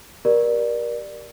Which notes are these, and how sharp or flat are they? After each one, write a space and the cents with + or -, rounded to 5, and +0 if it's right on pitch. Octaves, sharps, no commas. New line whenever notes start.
G4 +5 A#4 +30 D5 +10